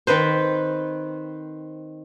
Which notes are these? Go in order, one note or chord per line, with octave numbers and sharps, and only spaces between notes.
D#3 C4 B4 C5